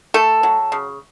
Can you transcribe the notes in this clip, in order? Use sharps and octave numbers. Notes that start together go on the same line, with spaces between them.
A3 A4
F#3
C#3